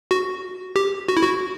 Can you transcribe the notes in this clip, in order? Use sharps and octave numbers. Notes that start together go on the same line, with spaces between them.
F#4
G4
F#4
E4
F#4